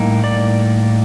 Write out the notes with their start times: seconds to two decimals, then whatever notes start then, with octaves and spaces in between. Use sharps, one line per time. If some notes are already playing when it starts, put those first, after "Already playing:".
Already playing: A2 G3 A#3 D#4
0.24 D5